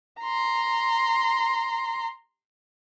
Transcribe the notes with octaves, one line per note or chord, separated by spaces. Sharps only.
A#5 C6